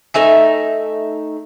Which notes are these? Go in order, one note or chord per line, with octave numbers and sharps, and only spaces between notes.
A3 D#4 E5 G#5